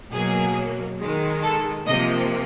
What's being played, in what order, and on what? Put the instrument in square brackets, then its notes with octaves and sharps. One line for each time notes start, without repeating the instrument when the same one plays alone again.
[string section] B2 F#3 A#3 G#4
D#3 G#3
A4
C3 F3 A#3 D#5